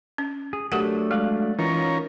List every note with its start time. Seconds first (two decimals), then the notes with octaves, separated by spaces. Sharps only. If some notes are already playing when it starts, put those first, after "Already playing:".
0.18 C#4
0.53 G#4
0.72 F#3 A3 D4 G4 A#4 F#5
1.11 G#3 D5 F5 F#6
1.59 E3 C#4 D#4 F4 A#4 C#5